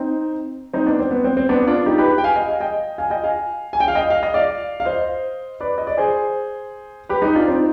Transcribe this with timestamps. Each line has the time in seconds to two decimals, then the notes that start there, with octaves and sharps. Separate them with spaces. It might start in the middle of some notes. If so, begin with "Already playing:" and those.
Already playing: C4 D#4
0.74 C4 D#4
0.86 B3 D4
0.99 C4
1.11 B3
1.24 C4
1.37 C4
1.49 B3 D4
1.67 D4 F4
1.86 D#4 G4
1.98 G4 B4
2.18 G5
2.24 F5 G#5
2.36 D#5 G5
2.48 F5 G#5
2.60 D#5 G5
2.98 F5 G#5
3.10 D#5 G5
3.24 F5 G#5
3.73 G#5
3.80 G5
3.88 F5
3.95 D#5 G5
4.10 F5
4.23 D#5
4.34 D5 F5
4.80 F5
4.85 C5 D#5
5.60 B4 D5
5.78 D#5
5.87 D5
5.98 G#4 C5
7.09 G4 B4
7.22 D#4 G4
7.35 D4 F4
7.48 C4 D#4